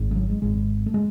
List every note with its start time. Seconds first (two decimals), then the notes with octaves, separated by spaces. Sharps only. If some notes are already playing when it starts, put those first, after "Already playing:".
Already playing: G#1 G#2
0.11 G#3
0.16 F#3
0.29 G#3
0.42 G#1 G#2 G#3
0.86 A3
0.94 G#3